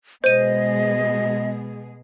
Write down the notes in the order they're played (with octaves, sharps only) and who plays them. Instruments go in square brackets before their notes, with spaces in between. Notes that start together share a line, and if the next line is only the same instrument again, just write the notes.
[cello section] B2 G#3 G#4 [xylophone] C5 D#7 [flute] D#5